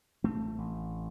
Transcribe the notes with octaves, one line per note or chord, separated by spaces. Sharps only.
A1 A3 C4
A1